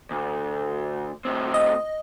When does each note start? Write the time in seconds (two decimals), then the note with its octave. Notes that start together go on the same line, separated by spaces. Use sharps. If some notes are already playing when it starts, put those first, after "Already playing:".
0.11 D2
1.25 A2 C4
1.54 D#5